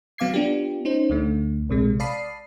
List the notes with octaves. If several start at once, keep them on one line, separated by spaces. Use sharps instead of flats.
F#3 B3 F5 D6 G#6 C7
B3 D4 F4 G4
C#4 D#4 C5
D2 D3 A3
A#1 C3 G#3
D5 F5 A5 B5 D#6 C7